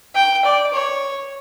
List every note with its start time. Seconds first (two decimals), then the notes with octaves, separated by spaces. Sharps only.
0.15 G5
0.45 D5
0.73 C#5